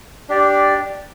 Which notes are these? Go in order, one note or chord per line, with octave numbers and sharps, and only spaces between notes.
D4 G4 D5